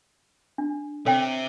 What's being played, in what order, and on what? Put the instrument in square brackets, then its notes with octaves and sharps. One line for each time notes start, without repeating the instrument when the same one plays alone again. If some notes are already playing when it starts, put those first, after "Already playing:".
[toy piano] D4
[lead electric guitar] C3 [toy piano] A4 C#5 G5